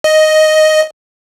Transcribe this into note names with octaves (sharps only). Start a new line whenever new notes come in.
D#5